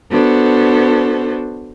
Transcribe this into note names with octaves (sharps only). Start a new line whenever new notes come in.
B3 D4 F#4 A4 C5